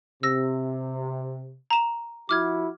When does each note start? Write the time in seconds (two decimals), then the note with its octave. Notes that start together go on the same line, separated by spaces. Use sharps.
0.23 C3 E6 A#6
1.70 A#5 E7
2.29 F3 E4 F#4 D6 F6 G#6